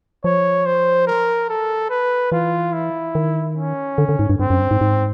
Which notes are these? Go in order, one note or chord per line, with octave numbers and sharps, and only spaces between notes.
F3 C#5
C5
A#4
A4
B4
E3 F4
E4
D#3
C#4
D3
D3
G#2
G2
G2 C4
F#2
G2
G#2
G#2